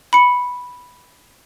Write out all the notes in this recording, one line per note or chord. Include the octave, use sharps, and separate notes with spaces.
B5 C#7